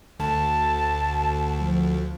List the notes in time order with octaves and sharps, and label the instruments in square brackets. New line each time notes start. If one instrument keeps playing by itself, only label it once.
[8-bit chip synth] D2 [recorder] A5
[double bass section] F3